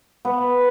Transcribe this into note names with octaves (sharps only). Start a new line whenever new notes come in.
B3